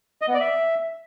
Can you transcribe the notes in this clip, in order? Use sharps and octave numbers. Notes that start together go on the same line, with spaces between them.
D#5
B3
D5
E5